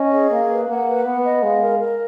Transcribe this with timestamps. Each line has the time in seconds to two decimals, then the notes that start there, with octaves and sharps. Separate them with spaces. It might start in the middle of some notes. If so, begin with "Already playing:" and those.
Already playing: C#4 D#5
0.12 G#4
0.30 A#3 F5
0.50 B4
0.68 A#3 F#5
0.86 B4
1.05 B3 F#5
1.24 D#5
1.42 G#3 F5
1.61 A#4
1.80 A#4